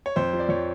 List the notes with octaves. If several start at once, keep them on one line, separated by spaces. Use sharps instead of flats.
C#5
F2 C5
F3
D5
F2 C#5